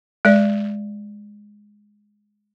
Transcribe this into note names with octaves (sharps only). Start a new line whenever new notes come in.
G#3 D5